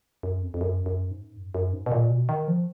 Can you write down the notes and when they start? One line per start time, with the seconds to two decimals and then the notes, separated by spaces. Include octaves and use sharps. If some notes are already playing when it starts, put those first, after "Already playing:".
0.23 F#2
0.42 F2
0.54 F2
0.61 F#2
0.86 F#2
1.11 G#2
1.36 F#2
1.55 F#2
1.73 G#2
1.86 B2
1.92 A#2
2.10 B2
2.29 D#3
2.48 F3